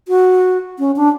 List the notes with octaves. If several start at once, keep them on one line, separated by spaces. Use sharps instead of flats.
F#4
C#4
D4